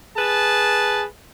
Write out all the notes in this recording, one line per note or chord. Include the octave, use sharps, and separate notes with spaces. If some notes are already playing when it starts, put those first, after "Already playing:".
G#4 B4 A5